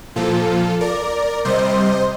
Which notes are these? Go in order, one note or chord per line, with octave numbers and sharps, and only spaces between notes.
A#2 F3 F4 A4
A#4 D5
C3 G3 C5 D#5